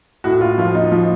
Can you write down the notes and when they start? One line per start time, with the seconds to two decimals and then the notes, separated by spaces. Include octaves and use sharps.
0.24 A2 F#4
0.41 F4
0.58 F3 F4
0.75 D#4
0.92 F3